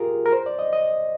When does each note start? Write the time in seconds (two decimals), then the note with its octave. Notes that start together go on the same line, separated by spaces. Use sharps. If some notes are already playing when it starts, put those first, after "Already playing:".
Already playing: F4 G4 G#4 A#4
0.26 A#4
0.32 C5
0.46 D5
0.59 D#5
0.73 D#5